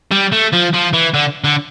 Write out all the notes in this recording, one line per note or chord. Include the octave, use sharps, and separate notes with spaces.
G3
A3
F3
F3
E3
D3
D3